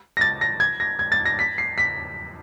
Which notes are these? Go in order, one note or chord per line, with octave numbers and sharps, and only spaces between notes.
A#6
A6
A#6
G#6
A#6
G#6
A6
A#6
B6
C7
B6